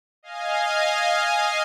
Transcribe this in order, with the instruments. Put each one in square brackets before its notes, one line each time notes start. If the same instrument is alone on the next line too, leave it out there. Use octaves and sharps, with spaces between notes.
[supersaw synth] D#5 F5 G#5